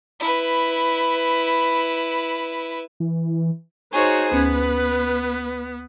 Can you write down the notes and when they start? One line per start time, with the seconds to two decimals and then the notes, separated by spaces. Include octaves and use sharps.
0.20 E4 B4
3.00 E3
3.93 D#4 F#4 G#4 C5 C#5
4.32 D2 B3 C#4 B4 G#6